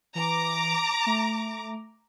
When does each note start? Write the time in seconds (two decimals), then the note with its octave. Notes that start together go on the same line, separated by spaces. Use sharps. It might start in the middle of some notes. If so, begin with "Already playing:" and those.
0.15 E3 A#5 D6
1.06 A3